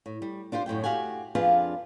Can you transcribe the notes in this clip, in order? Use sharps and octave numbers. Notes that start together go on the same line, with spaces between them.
A2
G3
D4 F4 G4 C5
F#2 A2 E4 G5
F#4 G4 F5 F#5 G#5
F2 F3 D4 F4 G#4 B4